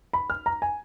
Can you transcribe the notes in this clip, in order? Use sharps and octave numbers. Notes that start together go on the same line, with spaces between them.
B5
F6
A#5
G#5